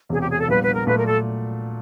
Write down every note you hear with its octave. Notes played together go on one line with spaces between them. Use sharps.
E1 E2 C3 G#4
G4
G#4
A4
A#1 A#2 G3 B3 B4
B4
A#4
A#2 F#3 A3 B4
A#4
A4